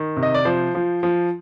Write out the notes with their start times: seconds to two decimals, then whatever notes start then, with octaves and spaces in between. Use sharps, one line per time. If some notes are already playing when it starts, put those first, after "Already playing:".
Already playing: D#3
0.16 C3
0.23 D#5
0.34 D5
0.45 F3 C5
0.75 F3
1.03 F3